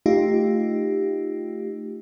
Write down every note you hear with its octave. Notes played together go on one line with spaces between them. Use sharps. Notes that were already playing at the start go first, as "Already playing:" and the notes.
A3 D#4 F4 G4